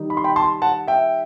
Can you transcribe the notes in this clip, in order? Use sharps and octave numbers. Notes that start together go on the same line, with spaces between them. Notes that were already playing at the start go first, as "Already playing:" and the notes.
Already playing: D#3 G3 D#4
B5
C6
G5 B5
A5 C6
F#5 A5
E5 G5